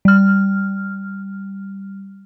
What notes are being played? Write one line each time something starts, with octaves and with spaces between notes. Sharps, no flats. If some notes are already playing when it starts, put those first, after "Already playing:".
G3 F6